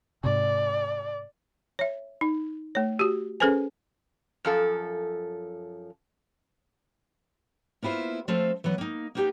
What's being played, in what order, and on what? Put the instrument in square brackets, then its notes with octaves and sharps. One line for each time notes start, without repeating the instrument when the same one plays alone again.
[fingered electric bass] G#2 C3 [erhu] D5
[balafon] C#5 E5
D#4
A3 C#5
F#4 G4
C#4 G#4 A4 B4 C5 G#5
[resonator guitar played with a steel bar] F#2 F3 A4
[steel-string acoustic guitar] A#3 B3 E4 F4 C5
F3 A3 C4 F4 A4 F5
E3 F#3 B3
A#3 D#4
A#3 B3 D#4 F#4 G4